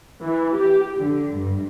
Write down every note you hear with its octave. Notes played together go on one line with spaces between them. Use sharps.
E3
G4
D3
G2